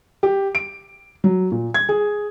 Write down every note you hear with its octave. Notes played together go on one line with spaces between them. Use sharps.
G4
D7
F#3
A#2
G#6
G#4